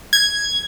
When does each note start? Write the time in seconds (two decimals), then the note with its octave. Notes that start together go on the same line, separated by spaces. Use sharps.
0.13 G#6